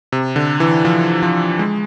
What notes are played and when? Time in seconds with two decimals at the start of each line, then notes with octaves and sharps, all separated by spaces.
0.12 C3
0.36 D3
0.60 E3
0.85 F3
1.23 F3
1.59 G#3